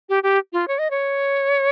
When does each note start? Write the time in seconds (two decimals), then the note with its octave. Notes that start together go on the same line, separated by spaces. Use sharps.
0.09 G4
0.23 G4
0.53 F4
0.68 C#5
0.79 D#5
0.91 C#5